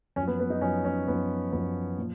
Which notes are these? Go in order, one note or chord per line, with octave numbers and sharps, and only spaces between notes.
F#2 F3 C#4
B3
B3
D#4
F#2 F3 C#4
C#4
F#2 F3 B3
F#2 F3 B3
A#2 F3